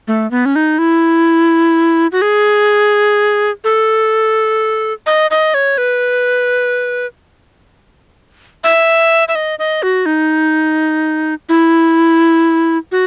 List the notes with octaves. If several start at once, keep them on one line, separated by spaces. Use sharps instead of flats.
A3
B3
C#4
D#4
E4
F#4
G#4
A4
D#5
D#5
C#5
B4
E5
E5
D#5
D#5
F#4
D#4
E4
F#4